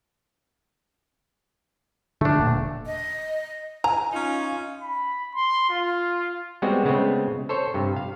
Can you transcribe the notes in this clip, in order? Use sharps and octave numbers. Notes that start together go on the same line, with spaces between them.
D3 A3 D4
E1 A#2
D#5
G#5 A#5
C#4 D#4 F4
B5
C6
F4
G3 G#3 B3 C4 F#4
C#3 G#3 A3 B3 C4
A4 C5 C#5
G2 C3
F5